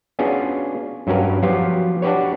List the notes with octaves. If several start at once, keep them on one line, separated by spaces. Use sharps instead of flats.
B3 C#4 D4 F4 F#4 G#4
G2 F#3 C#4 A#4 B4
F3 F#3 B3 F4 G4
D4 F#4 G4 B4 C#5